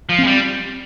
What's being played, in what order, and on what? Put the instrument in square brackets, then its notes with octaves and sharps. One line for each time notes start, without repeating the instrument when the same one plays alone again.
[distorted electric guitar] F3
[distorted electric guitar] G#3 [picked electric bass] C4
[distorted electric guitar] G3